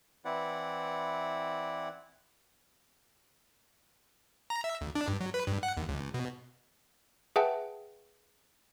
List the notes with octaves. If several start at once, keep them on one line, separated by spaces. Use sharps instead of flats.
E3 C4 E4 B4 D5 F#5
A#5
E5
D2
D4
G2
F#3
B4
G2
F#5
D#2
C#2
B2
G#4 B4 E5 F#5 G5 A5